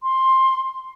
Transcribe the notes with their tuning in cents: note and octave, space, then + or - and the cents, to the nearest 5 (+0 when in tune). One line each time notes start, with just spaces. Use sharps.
C6 +15